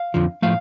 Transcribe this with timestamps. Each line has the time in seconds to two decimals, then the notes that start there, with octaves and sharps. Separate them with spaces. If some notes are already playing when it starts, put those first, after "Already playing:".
Already playing: F5
0.14 F2 D3 F3
0.42 A2 F3 A3 F5